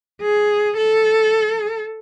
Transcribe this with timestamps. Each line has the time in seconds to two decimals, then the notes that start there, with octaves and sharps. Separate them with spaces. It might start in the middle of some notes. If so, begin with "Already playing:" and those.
0.22 G#4
0.77 A4